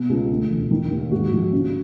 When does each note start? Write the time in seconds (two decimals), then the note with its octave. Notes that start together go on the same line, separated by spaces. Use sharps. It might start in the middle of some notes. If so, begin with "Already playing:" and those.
Already playing: B2
0.09 C#2
0.30 D2
0.50 E1
0.71 D#3
0.91 D#2
1.11 G#2 F#4
1.32 A#1
1.52 C#3